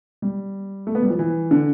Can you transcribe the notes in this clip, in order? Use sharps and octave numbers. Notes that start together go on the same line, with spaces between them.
G3
A3
B3
G3
F3
E3
D3